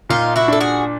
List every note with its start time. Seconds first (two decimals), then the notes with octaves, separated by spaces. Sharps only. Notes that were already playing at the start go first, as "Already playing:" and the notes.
0.09 A#2 D#4 F4
0.36 E4 F#4
0.48 D4 A4
0.60 F#4 G#4